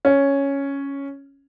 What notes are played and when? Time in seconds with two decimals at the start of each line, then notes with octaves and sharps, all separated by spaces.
0.05 C#4